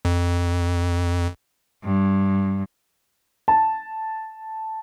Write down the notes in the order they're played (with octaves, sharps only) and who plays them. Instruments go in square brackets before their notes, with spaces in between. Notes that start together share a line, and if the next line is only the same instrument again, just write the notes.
[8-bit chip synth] F2
[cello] G2
[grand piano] A5